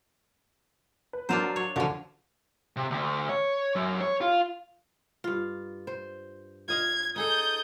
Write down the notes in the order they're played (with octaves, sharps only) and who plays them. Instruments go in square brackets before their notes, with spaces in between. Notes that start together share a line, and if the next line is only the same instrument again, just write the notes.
[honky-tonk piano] B4
[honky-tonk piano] F#3 F#4 A#4 [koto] D4 F4 C5
[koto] C#5
[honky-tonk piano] C#2 F#4 C#6 [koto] D3 F3
[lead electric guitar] C3
D2
C#5
F#2
C#5
F4
[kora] G2 F4
C5
[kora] F4 D#5 F5 [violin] G#6
[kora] D#4 G#4 A4 [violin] D#6 G6